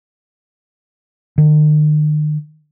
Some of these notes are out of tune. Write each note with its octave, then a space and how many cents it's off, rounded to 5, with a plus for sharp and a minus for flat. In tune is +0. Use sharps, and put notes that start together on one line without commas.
D#3 -45